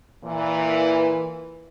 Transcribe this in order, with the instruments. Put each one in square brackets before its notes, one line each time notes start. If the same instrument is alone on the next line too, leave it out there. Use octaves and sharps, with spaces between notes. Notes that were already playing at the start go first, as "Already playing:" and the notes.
[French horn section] A#2 E3